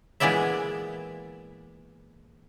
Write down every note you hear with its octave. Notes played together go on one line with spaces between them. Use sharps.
A#2 E3 G#3 B3 D5 E5